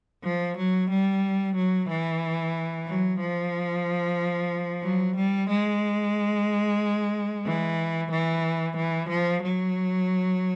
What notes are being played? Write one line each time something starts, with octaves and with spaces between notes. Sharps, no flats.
F3
F#3
G3
F#3
E3
F#3
F3
F#3
G3
G#3
E3
E3
E3
F3
F#3